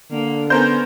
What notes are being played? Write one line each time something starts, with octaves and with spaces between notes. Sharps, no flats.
D3 A#3
B3 C#4 A#4 C5 G6